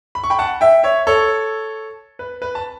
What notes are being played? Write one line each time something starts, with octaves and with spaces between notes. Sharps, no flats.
B5
C#6
G5 B5
F#5 A5
E5 G5
C#5 E5
A4 C#5
B4
B4
A5